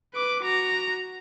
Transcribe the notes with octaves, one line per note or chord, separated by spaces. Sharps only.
B4 D6
F#4 A#5